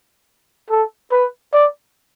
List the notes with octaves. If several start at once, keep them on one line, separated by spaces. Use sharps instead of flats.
A4
B4
D5